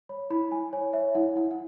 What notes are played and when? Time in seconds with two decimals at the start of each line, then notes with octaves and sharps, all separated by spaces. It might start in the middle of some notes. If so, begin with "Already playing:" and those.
0.09 C#5 B5
0.30 E4 B5
0.52 E4 G#5
0.73 C#5 G#5
0.93 C#5 E5
1.15 E4 F#5
1.36 E4 F#5
1.51 F#5